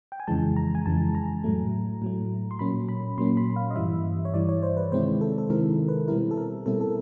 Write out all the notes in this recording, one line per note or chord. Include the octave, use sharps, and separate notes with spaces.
G5
G#5
F2 C#3 E3 G#3 A5
A#5
G#5
F2 C#3 E3 G#3 A5
A#5
A2 F#3 A3
A2 F#3 A3
C6
A#2 F#3 A#3 C#4 B5
B5
A#2 F#3 A#3 C#4 C6
B5
F5
D#5
G2 E3 G3 E5
C#5
G2 E3 G3 D5
C#5
C5
B4
C3 D#3 G#3 C4 E4 C5
A4
A4
C3 D#3 G#3 C4 E4 A#4
B4
B2 G3 C4 E4 A#4
A4
A#4
B2 G3 C4 E4 A4
A4